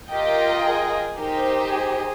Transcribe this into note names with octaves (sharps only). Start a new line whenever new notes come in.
F4 G4 A#4 D#5 G5
G#4
D#4 G4 A#4 C5
G#4